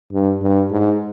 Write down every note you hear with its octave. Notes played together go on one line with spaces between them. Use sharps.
G2
G2
G#2